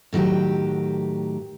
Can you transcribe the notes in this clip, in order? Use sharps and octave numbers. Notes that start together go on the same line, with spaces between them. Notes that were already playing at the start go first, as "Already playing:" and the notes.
A2 D#3 F#3 G4